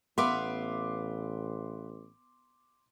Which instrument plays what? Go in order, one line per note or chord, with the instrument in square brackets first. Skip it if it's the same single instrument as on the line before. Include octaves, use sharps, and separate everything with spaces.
[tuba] A1 [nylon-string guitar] B3 [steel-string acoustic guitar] B4 E5 F5 [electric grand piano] C6 D6